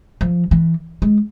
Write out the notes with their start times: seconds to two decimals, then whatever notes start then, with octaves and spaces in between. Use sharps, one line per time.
0.21 F3
0.51 E3
1.02 G#3